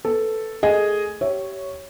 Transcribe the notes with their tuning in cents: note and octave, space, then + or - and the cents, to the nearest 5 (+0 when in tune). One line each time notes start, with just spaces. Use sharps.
B3 +0 A4 +0
A3 +15 G#4 +0 D#5 +0
G4 -25 C#5 +0 E5 +0